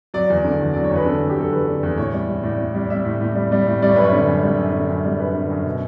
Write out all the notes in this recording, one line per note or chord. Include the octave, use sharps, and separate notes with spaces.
F#3 D5
E2
D3
E2
F#3 D5
C#5
E2 B4
D3 A4
E2
G4
F#3 A4
E2 B4
D3
E2
A2 C#5
G3
G3
A2 D5
A2
G3
G3 E5
A2
A2
G3
G3
A2
G3 D5
C#5
F#2 B4
C#5
D3
F#2
G3
F#2
D3
F#2
G3
F#2 B4
D3
F#2
B2